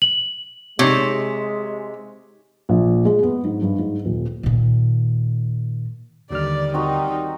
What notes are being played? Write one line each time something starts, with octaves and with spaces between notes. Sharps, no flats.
F#7
C3 G#3 D#4 G4 C#5
A#1
G#3
B3
G#2
G2
G#2
D#1
A#2 D#3
D#2 D3 D#3 G3 D5 F6
C4 D#4 F#4 A#4